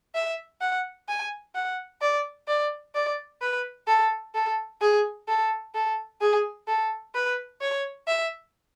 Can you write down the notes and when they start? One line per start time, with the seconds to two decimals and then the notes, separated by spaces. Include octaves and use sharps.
0.15 E5
0.61 F#5
1.08 G#5
1.55 F#5
2.02 D5
2.48 D5
2.95 D5
3.42 B4
3.88 A4
4.35 A4
4.81 G#4
5.28 A4
5.75 A4
6.21 G#4
6.68 A4
7.15 B4
7.61 C#5
8.07 E5